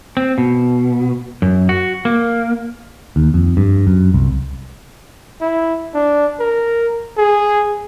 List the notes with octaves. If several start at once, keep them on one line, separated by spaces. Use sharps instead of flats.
C4
B2
F#2
F#4
A#3
D#2
F2
G2
F#2
C2
E4
D4
A#4
G#4